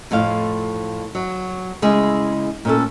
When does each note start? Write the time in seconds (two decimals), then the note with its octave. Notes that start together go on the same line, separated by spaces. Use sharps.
0.11 F2 A2 F4 F5
1.15 F#3
1.82 C#3 G#3 E4 G#4
2.65 A#2 C#4 A4